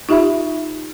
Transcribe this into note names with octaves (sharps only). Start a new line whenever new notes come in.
D#4 F4 G4 E5 B5